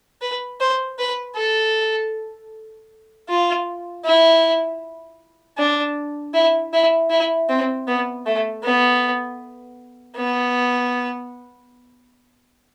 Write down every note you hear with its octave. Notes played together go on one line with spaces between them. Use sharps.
B4
C5
B4
A4
F4
E4
D4
E4
E4
E4
C4
B3
A3
B3
B3